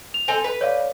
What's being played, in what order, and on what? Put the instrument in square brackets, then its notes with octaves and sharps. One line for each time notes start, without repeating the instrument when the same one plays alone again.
[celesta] F7
[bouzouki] C4 A4 G#5
B4
[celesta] C#5 D5 F5